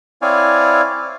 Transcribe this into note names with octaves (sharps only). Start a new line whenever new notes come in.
C4 E4 C#5 D5 F5 G#5